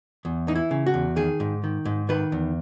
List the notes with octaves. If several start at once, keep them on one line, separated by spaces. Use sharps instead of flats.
E2
E3 D#4
E4
C#3
F#4
E2
D#3 G#4
G#2
D#3
G#2
D#3 B4
E2